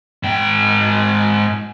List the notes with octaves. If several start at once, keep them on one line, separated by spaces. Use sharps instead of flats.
G#2 G5